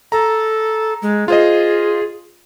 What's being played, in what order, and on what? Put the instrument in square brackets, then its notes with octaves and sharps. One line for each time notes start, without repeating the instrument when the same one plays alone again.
[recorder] A4 [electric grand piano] A#5
[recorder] G#3
[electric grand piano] F4 C5 D#5 [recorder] G#4